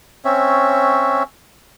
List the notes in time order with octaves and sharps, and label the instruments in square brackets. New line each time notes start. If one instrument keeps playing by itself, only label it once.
[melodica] C4 C#4 C#5 E5